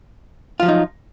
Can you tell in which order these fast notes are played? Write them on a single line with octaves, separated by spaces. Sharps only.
F4 F3 F#3 D#4